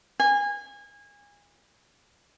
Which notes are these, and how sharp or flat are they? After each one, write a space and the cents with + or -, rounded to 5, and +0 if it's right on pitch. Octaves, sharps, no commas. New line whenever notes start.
G#5 -25